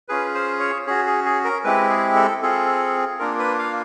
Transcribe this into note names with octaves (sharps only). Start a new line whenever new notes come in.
C#4 F4 G#4 B4
C5
C#5
C#4 F#4 G#4
G#4
G#4
A#4
G#3 C4 E4 G4 B4
G#4
A4
C4 F4 G#4 A4
A#3 D4 F4 A#4
B4
F5